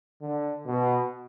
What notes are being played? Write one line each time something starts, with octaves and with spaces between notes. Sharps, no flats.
D3
B2